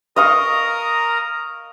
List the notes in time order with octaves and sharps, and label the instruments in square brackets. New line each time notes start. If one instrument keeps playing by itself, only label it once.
[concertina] A#4 A#5 D#6 [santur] D#5 F5 C#6